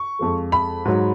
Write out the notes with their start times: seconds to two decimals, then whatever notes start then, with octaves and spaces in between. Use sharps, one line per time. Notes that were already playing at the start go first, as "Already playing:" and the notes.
Already playing: C#6
0.19 F2 F3 G#3
0.52 B5
0.85 G#2 F#3